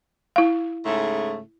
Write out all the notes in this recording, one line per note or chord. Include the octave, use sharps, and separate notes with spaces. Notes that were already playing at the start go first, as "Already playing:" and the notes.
E4 F5
G#2 C#3 A3